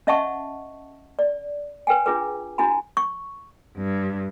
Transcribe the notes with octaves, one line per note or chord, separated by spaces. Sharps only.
C#4 D#5 E5 F#5 A5 C#6
D5
B4 G5 G#5
D4 F4 G#4 B4
D4 E4 F#4 G#5 B5
C#6
G2